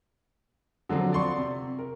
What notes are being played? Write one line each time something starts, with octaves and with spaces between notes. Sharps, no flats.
D3 F3 F#3 C4
D5 C6 C#6
C3
A#4